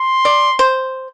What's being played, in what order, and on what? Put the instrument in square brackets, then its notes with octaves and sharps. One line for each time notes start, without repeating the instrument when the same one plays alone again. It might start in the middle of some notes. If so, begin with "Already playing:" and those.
Already playing: [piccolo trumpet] C6
[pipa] D5
C5